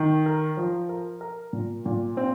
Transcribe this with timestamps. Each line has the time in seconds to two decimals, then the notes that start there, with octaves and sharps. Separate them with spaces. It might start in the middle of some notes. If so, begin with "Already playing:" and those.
Already playing: D#3
0.26 A#4
0.57 F3
0.89 A#4
1.21 A#4
1.53 A#2
1.86 A#2
2.17 C4